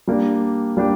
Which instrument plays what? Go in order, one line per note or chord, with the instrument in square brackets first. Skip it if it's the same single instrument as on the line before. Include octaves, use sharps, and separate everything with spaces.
[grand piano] G3 A#3 D4 G4
G3 A#3 D4 G4